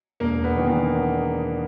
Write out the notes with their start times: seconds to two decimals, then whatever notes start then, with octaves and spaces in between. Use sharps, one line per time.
0.20 E1 A#3
0.44 B3
0.56 E2 D#3
0.66 A#3